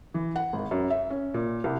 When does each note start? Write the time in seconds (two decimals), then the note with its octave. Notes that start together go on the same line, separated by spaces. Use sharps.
0.14 E3
0.36 F#5
0.53 G#1
0.71 F#2
0.90 E5
1.10 C#4
1.34 A#2
1.64 C2